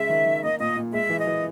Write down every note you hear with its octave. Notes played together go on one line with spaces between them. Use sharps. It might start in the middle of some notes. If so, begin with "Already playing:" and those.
Already playing: C#3 G#3 E5
D#3
D#3
A#3 D#5
A#2 D#5
A#2
G#3 E5
E3
D#5
E3